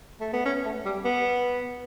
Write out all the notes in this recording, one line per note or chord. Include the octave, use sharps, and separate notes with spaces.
A3
B3
C#4
A3
G3
B3